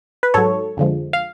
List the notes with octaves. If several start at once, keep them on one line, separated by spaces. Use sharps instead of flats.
B4
G#2 F#3 A4 C#5
F2 D3 F3 G#3
F5